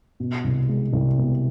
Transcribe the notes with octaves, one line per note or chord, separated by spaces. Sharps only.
B2
C2
G#3
C2
B2